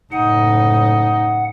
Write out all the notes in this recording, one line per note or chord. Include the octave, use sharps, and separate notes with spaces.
F#1 A2 D#4 F#5